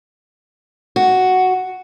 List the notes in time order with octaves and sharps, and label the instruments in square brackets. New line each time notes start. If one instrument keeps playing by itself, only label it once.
[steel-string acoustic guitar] F#4